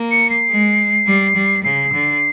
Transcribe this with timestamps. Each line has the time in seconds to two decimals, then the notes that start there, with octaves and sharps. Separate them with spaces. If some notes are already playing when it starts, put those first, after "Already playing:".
Already playing: A#3
0.11 C#7
0.30 C7
0.49 G#3
1.06 G3
1.35 G3
1.64 C#3 C7
1.93 D3